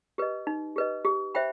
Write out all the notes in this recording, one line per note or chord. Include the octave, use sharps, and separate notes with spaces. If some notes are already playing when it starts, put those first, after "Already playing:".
G4 B4 D#5
D#4
G4 B4 D#5
G4
C5 E5 G5 B5